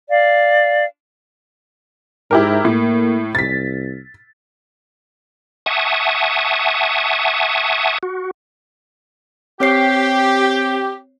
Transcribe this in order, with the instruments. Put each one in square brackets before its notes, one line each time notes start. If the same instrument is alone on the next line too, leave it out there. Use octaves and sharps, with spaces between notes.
[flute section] D5 F5
[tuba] G#2 [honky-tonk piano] E4 G4 A#4
[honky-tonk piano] A2 [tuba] A#3
[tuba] C2 [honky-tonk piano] A6 B6
[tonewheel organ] E5 F#5 G#5 A5 C#6 D#6
F#4
[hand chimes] C4 C#5 C7 [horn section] G4